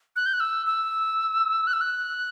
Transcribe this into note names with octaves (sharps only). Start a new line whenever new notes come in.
F#6
G6
F#6
E6
E6
F#6
E6
F#6